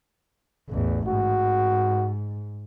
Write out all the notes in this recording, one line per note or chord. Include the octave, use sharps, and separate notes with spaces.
A1 E2
G#2 F#4